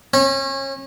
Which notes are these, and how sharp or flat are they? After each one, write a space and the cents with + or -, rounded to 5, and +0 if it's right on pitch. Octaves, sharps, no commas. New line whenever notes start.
C#4 -30